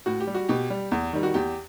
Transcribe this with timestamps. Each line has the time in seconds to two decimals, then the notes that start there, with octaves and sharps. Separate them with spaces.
0.06 A2 F#4
0.20 G4
0.27 G3
0.35 F#4
0.49 B2 G4
0.70 G3
0.92 E2
1.13 D#3 G3
1.23 F#4
1.34 E2 G4